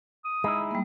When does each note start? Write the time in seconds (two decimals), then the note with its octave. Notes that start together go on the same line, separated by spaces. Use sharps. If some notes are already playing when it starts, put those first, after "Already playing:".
0.25 D#6
0.44 G#3 D#4 E4 B5
0.71 G3 A#3